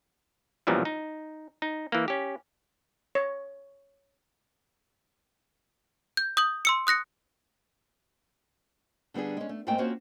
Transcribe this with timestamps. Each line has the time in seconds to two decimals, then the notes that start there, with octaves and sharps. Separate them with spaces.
0.67 B1 F#2 A#2 E3 F3 G3
0.85 D#4
1.62 D#4
1.92 E3 A#3
2.08 C#4 G4
3.15 C#5
6.17 G6
6.37 D#6 G6 F#7
6.65 C6 E6 C#7
6.87 D#6 F#6 A#6 C#7
9.14 D3 G3 B3 D4 G#4
9.37 G#3 C#4
9.49 A3
9.67 G#2 A3 A#3 C4 C5 G5
9.78 A#3 C4 C#4 F4 F#4 C5